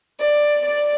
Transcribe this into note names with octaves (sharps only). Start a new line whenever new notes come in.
D5
D5